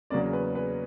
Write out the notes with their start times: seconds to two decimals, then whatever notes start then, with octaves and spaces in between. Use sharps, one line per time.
0.10 E2 C#3 F#3 A#3 C#4 D5
0.33 B4
0.55 B4